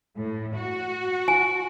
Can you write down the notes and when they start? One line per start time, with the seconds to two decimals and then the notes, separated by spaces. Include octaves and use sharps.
0.17 A2
0.56 F#4
1.28 G#5